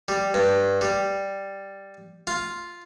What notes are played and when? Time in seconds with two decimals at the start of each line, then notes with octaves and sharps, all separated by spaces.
0.08 G3
0.34 G2
0.81 G3
2.27 F4